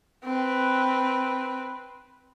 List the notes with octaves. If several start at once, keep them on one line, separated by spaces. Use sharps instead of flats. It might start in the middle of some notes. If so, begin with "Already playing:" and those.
C4 B4